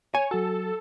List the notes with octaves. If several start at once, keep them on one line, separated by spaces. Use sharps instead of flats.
C#5 G#5
F#3 F#4 A4